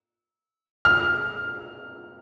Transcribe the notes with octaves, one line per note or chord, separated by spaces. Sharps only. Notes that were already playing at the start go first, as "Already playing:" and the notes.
F6